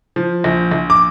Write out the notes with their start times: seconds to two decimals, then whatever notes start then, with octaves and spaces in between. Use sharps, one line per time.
0.16 F3
0.44 A#1
0.71 A#1
0.90 D6